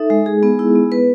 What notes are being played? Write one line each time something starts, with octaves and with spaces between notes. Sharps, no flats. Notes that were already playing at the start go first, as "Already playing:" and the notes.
Already playing: D#4 A4 E5
G#3
G#4
B3
E4
B3
B4